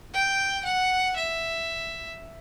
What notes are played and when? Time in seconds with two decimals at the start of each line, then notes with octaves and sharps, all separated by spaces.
0.14 G5
0.65 F#5
1.16 E5